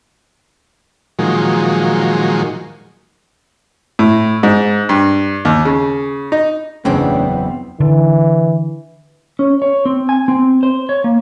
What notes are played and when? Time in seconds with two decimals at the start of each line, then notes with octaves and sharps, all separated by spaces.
1.19 A#2 D#3 F3 F#3 G#3
3.99 A2
4.43 G#2
4.89 G2
5.45 D#2
5.65 C#3
6.32 D#4
6.85 F#1 E2 A2 C#3 B3 C4 D4
7.80 D3 E3
9.39 C#4
9.62 C#5
9.85 C4
10.09 G#5
10.28 C4
10.63 C5
10.89 C#5
11.04 A#3